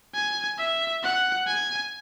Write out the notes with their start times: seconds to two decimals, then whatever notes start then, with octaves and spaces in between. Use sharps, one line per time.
0.15 G#5
0.58 E5
1.03 F#5
1.47 G#5